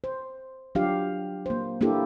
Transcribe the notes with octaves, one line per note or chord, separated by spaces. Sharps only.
C5
F#3 D4 F4 G4 F5
A#3 C5
A#3 D4 E4 G4 A4